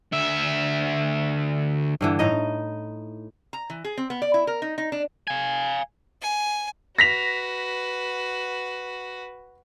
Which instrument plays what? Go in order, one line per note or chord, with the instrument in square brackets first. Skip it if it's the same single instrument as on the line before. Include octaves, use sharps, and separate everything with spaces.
[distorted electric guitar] D2 E5
[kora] G2 D3 E3
A2 D#4 D#5
[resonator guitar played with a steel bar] A#5
E3
G#4
C4
B3
D5
E4
A#4
D#4
D#4
D4
[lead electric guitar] F5 G#5
[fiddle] G#5
[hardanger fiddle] F#4 B4 [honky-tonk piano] A#6 B6 F7